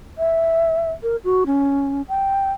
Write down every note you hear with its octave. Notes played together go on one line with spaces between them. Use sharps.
E5
A#4
F#4
C#4
G5